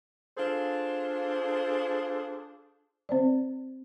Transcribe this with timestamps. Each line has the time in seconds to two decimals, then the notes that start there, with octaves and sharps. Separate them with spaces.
0.37 D4 F4 G#4 A4 C5
3.09 C4 C5 D5